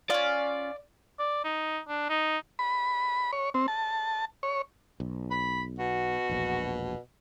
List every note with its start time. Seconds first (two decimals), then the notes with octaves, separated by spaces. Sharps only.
0.10 C#4 F4 D5
1.19 D5
1.44 D#4
1.88 D4
2.09 D#4
2.59 B5
3.33 C#5
3.54 C4
3.68 A5
4.43 C#5
5.00 B1
5.31 B5
5.79 B2 F#4
6.29 E1 A#1